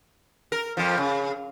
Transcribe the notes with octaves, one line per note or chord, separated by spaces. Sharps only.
A#4
F2 F3
C#3